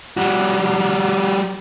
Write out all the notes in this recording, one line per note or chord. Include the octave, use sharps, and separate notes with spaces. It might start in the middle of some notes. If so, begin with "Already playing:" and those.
G3 F#4